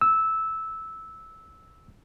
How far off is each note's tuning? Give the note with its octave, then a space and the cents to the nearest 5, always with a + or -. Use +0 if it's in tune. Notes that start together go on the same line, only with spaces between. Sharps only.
E6 -10